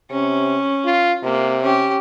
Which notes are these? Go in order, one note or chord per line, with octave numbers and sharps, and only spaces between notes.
C3 C#4
F4
C3 A#3
C#4 G4